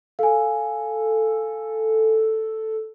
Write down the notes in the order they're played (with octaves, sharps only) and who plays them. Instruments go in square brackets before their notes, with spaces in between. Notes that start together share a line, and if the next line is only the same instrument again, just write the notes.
[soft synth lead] A4 [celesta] F5 G#5